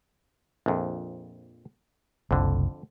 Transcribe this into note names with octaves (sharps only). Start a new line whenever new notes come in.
A#1 F2
F#1 C2 F2 D3